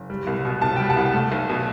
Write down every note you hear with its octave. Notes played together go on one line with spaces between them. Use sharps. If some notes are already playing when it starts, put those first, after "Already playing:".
Already playing: F#1
G3
C2
B2
C2 A5
G3 G5
F#5 A5
C2
A3
B1
B2